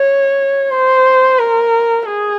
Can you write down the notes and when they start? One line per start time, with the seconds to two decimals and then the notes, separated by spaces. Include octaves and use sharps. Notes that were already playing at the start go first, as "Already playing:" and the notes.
Already playing: C#5
0.70 C5
1.39 A#4
2.06 G#4